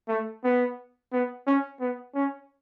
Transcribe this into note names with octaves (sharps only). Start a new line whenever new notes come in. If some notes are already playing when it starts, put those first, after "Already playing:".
A3
B3
B3
C#4
B3
C#4